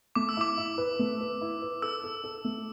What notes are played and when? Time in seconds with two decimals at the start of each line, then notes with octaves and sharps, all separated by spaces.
0.15 A3 D6
0.29 E6
0.37 E4 D6
0.58 E4
0.78 B4
0.99 A3
1.21 B4
1.41 E4
1.62 B4
1.82 A4 E6
2.04 A4
2.24 A4
2.45 A3